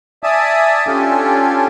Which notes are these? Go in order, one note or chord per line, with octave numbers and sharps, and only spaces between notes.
D5 E5 G#5 A5 D#6
C#4 D4 F4 G4 A4 G#5